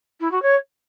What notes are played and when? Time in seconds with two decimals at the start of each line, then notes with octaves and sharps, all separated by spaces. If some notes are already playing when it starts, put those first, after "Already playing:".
0.21 E4
0.32 F#4
0.42 C#5